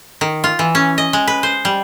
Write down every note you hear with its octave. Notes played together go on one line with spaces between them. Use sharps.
D#3
F4
E3
C#4
D#5
G#3
B4
C5
G3